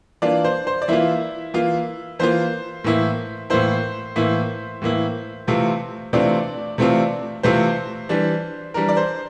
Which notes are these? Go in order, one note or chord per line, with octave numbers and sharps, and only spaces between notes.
E3 A#3 D4 F4 D5
C5
C5
D5
E3 A#3 E4 F4 E5
E3 A#3 F4
E3 A#3 F4 C5
A2 E3 A#3 E4
A2 E3 A#3 E4 C5
A2 E3 A#3 E4
A2 E3 A#3 E4
C3 E3 A3 C4 F4
C3 E3 A3 C4 D4 F4 D5
C3 E3 A3 C4 F4
C3 E3 A3 C4 F4 C5
E3 G3 D4
E3 G3 D4 A#4
D5
C5